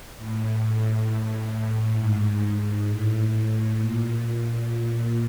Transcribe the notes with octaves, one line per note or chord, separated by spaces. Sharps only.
A2
A2
G#2
A2
A#2
A#2